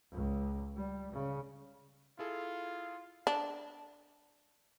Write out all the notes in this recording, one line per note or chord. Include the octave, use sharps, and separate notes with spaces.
C#2
G3
C#3
E4 F4 G#4 A4
D4